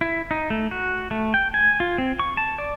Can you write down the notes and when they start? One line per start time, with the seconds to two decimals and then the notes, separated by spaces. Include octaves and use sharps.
0.01 E4
0.31 D#4
0.50 A3
0.71 F#4
1.11 A3
1.34 G5
1.54 G#5
1.80 F4
1.98 C4
2.19 C#6
2.37 A5
2.58 D5